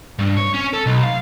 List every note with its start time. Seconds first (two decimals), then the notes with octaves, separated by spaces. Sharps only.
0.19 G2
0.37 C#5
0.54 C#4
0.73 A4
0.86 B1
1.03 F5